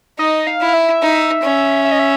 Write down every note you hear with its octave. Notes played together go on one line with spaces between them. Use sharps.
D#4 D#5
F5
E4
F5
E5
D#4
C#4
E5
D#5
E5